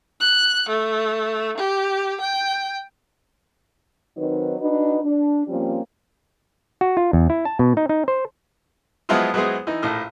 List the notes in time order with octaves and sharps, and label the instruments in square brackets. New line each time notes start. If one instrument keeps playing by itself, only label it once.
[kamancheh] F#6
A3
G4
G5
[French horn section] D#3 F#3 C4 D#4 B4
D4 D#4 F#4 B4 D#5
D4
F3 G3 A#3 C4 C#4
[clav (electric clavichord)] F#4
F4
E2
E4
A5
B2
D#4
D#4
C5
[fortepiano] F3 F#3 G#3 B3 E4 F4
F#3 G#3 B3 E4 G#4 C5
E3 D#4
A#1 A2 F6